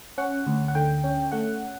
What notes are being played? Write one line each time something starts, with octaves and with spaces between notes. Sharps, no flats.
C#4 F#5
D2
F#5
D3 G5
C#4
A3 F#5